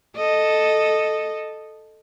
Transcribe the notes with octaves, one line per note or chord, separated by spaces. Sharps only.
A4 D#5